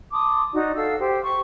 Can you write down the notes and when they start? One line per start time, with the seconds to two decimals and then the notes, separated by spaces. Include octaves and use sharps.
0.12 A5 C6 D6 D#6
0.54 D#4 F#4 D5
0.75 A4 F5 F#5 E6
0.99 G4 C5 G5
1.24 C#6